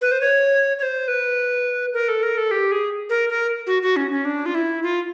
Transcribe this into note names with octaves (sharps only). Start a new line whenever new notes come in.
B4
C5
C#5
C#5
C5
B4
A#4
A4
A#4
A4
G4
G#4
A#4
A#4
F#4
F#4
C#4
C#4
D4
F4
E4
F4